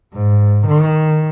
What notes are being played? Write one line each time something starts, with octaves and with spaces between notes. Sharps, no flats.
G#2
D#3